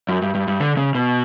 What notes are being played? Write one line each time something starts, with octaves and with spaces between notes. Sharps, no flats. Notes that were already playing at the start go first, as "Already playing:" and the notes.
F#2
G2
G2
G2
D3
C#3
B2